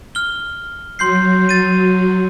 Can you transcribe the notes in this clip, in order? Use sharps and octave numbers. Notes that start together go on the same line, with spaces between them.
F6 G7
F#3 C6 G6 C7
A6 D#7